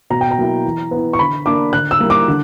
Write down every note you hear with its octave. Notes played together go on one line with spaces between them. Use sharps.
B2 A#5
G5
A#5
F#3 A#3 E4
E3
B3
E4
C#6
D3 B5
A#3 D4 D6
D3 F#6
E6
G3 A#3 E4
D6
D3